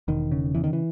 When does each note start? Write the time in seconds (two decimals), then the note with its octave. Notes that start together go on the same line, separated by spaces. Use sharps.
0.08 E1 D#3
0.32 C#3
0.55 E2 E3
0.64 D#3
0.73 E3